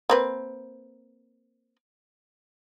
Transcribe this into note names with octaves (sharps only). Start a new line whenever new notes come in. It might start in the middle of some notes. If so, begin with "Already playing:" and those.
A#3 C4 B4